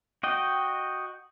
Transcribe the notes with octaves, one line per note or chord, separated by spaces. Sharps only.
F#4 D#5 G5